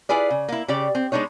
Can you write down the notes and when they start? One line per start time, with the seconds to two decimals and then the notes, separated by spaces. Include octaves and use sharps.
0.09 E4 F4 G#4 B4 D5
0.30 C#3
0.49 A#3 E4
0.68 C#3 G4 D5
0.95 C4
1.12 G#3 B3 D4 D#4 C#5